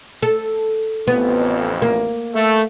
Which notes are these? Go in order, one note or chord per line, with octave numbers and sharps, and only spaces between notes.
A4
A1 F2 B3
A#3
A3